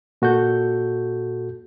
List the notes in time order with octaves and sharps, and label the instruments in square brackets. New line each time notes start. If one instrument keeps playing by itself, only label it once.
[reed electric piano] A#2 F#4 A4 G6